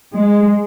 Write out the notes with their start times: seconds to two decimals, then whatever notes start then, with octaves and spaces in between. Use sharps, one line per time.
0.13 G#3